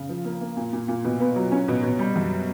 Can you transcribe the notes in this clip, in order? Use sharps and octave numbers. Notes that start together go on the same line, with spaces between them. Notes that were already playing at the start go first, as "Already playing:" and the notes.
Already playing: C#3
F3
A#3
A#3
A#2
A#2
A#2
B2
B3
F#3
C#4
B2
B2
G3
F#2